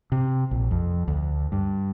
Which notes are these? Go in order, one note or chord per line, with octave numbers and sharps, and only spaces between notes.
C3
A#1
F2
D2
G2